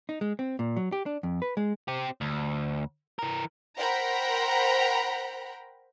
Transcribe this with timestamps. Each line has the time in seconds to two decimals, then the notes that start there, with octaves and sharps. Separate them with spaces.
0.09 D#4
0.21 G#3
0.39 C4
0.59 A#2
0.77 F#3
0.92 G4
1.06 D4
1.23 F2
1.42 B4
1.57 G#3
1.88 C4 G4
2.21 D2
3.19 E3 A#4
3.78 A#4 C5 F#5 G5 A#5 B5